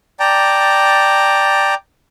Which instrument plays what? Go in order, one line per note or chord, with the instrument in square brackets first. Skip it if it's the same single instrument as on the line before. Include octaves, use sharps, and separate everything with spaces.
[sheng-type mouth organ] D5 G5 A5 A#5